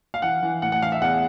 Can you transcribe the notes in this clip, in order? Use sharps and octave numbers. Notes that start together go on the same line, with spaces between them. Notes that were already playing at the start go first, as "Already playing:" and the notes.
F5
E3 F#5
E3
A2 F#5
F#5
E3 F5
E5
E2 F#5